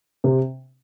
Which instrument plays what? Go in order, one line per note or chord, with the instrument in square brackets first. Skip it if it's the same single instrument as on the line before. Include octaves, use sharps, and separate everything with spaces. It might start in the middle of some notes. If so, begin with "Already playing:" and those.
[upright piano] C3